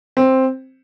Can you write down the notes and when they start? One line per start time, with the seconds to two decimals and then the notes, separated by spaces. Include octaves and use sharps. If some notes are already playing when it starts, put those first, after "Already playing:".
0.17 C4